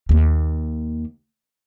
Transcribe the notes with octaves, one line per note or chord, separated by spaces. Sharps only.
D#2 A#3